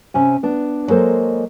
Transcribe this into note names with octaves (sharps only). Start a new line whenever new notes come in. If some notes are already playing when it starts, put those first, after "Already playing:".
C3 C#4 G#5
B3 D4
F#3 G#3 A#3 A4 C5